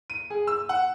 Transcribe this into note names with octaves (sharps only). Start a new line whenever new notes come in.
D#7
G#4
E6
F#5